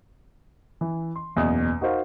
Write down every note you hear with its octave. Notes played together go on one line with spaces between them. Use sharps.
E3
C6
F#1 E2 B2 D#6
D#4 F#4 A#4 C5 F5